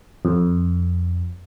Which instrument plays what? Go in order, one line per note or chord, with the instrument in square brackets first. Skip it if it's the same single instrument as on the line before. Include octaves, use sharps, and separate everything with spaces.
[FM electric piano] F2